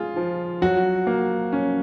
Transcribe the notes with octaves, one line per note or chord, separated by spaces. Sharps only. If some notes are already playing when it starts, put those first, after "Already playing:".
Already playing: G#3 F4 G#4
F3
F#3 F#4
A#3
C#4